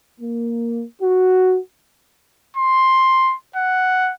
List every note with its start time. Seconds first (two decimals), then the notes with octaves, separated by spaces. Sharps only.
0.20 A#3
1.01 F#4
2.57 C6
3.56 F#5